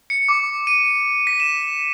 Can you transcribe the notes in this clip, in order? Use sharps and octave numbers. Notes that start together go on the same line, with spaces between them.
C#7
D6
D#7
B6
E7